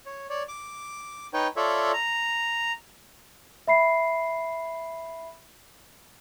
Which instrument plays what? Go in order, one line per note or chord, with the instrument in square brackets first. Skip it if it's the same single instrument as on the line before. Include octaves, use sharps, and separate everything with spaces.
[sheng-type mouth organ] C#5
C#5 D5
D6
D#4 B4 C#5 G5
F4 A4 C#5 D5 E5
A#5
[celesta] E5 B5 C7